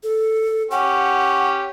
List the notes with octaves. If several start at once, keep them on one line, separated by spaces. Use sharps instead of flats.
A4
C#4 G4 F#5